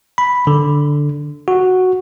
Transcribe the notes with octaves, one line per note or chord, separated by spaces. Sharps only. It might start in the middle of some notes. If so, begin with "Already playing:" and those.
B5
D3
F#4